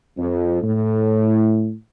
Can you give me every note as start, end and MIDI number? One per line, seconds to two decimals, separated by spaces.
0.17 0.60 41
0.62 1.72 45